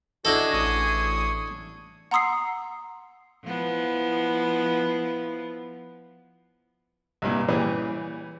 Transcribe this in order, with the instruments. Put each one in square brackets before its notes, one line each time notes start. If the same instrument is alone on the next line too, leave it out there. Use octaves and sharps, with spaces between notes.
[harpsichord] D4 E4 A4 [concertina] F#4 D#5 [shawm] G#4
[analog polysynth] A1 D#6 [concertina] C#6
[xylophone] F#5 A#5 C6 D#6 E6 C7
[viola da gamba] F3 B3 E4
[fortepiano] C2 G2 A#2
A#2 C#3 E3 G3 G#4 B4